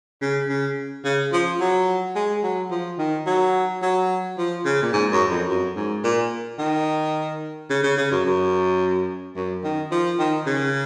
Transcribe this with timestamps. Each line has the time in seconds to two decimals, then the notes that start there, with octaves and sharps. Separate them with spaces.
0.21 C#3
0.49 C#3
1.04 C#3
1.32 F3
1.60 F#3
2.15 G#3
2.43 F#3
2.71 F3
2.98 D#3
3.26 F#3
3.82 F#3
4.37 F3
4.65 C#3
4.82 A#2
4.93 G#2
5.11 F#2
5.29 F2
5.48 F#2
5.76 G#2
6.03 A#2
6.58 D#3
7.69 C#3
7.83 C#3
7.97 C#3
8.11 F#2
8.25 F#2
9.36 F#2
9.63 D#3
9.91 F3
10.19 D#3
10.46 C#3